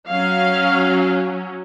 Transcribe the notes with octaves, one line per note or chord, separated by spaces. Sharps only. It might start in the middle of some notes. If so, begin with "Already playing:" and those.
F#3 C#4 F5